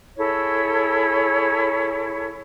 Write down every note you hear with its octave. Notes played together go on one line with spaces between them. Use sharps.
E4 G#4 A4 C#5